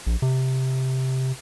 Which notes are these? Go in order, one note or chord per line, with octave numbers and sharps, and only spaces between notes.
A#1
C3